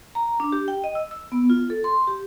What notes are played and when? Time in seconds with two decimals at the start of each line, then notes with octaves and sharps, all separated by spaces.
0.15 A#5
0.40 D4
0.52 G4
0.68 G5
0.84 D#5
0.95 E6
1.11 E6
1.32 B3
1.50 F4
1.70 A4
1.84 C6
2.07 G4